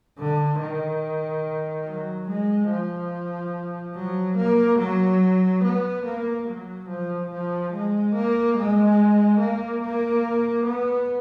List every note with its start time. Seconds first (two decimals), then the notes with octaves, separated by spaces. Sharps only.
0.18 D3
0.61 D#3
1.86 F#3
2.28 G#3
2.70 F3
3.95 F#3
4.37 A#3
4.79 F#3
5.64 B3
6.05 A#3
6.48 F#3
6.89 F3
7.30 F3
7.73 G#3
8.15 A#3
8.57 G#3
9.40 A#3
9.83 A#3
10.66 B3